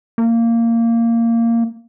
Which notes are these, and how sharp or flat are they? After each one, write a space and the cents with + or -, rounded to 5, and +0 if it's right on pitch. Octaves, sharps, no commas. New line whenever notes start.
A#3 -15